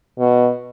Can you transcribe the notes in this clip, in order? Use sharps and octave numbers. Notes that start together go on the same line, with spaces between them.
B2